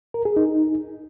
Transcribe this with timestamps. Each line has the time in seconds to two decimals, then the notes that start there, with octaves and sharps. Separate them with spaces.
0.14 A#4
0.25 G#4
0.36 D#4